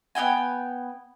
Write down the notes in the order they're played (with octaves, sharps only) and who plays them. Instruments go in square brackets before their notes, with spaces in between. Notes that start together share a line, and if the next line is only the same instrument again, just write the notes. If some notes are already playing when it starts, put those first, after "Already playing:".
[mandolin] B3 D#4 G5 G#5